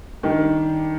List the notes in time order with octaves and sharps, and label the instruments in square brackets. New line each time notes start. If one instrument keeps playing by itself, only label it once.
[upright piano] D#3 [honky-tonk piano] G3 D4 G4